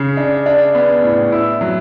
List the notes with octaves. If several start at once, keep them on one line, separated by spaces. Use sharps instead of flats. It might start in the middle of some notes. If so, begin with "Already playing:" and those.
Already playing: C#3
D4
D4
B3
A2
E4
F#3